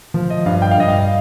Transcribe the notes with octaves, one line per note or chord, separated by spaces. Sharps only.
F3
D#5
G2 F5
G5
F5
G2 D#5
F5